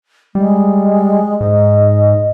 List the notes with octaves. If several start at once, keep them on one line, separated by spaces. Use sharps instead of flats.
G3 G#3
G#2 D#5